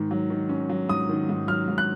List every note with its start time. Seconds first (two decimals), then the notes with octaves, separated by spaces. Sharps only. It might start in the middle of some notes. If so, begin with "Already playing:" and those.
Already playing: G#2 D#3
0.11 F#3
0.30 D#3
0.49 C#4
0.69 F#3
0.89 G#2 D#6
1.09 D#3
1.29 G#2
1.48 F#3 F6
1.68 G#2
1.78 F#6